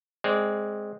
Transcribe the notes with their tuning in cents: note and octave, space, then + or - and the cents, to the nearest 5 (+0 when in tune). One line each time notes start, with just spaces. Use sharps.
G#3 +0 C4 +0 D5 -15